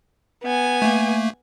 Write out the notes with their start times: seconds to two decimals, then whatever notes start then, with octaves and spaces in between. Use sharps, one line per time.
0.43 B3 G#5
0.82 A3 A#3